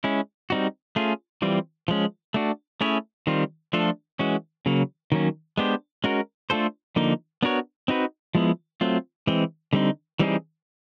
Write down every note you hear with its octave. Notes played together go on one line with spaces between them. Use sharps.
G#3 C#4 E4
G3 C4 D#4 F#4
A3 C#4 F4 G#4
E3 G3 C4 F4
F3 G#3 C#4
A3 D4 F#4
A3 C#4 E4 G#4 C#5
D#3 G3 C4 F4
F3 A3 D4 F4 A4
E3 G#3 C#4 F#4
C#3 F#3 A#3
D#3 F#3 A#3 C#4
G#3 B3 D4 G4 C5
G#3 C#4 F#4 A#4
A3 D4 F4 A4 C5
D3 F3 A#3 D#4
B3 D4 F#4 A#4 C#5
C4 D#4 F#4 B4
F3 G#3 B3 E4
F#3 A3 C4 F4
E3 G#3 C4
D3 G3 C4 D#4
E3 G3 C4 D#4 G#4